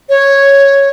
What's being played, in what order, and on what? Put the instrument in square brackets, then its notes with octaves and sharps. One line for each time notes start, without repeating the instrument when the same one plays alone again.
[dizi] C#5